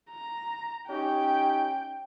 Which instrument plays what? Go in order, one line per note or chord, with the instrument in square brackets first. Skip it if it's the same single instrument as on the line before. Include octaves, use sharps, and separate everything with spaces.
[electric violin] A#5
[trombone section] C#4 D#4 G4 [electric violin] G5